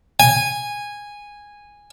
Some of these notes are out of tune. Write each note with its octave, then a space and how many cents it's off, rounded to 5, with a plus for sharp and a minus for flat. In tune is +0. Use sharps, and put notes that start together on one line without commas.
G#5 -10